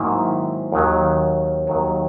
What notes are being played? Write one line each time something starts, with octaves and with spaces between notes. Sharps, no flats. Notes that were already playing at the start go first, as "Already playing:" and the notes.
Already playing: G#2 D#3 F#3 A#3 E4
D#2 D#3 F#3
D#2 D#3 F#3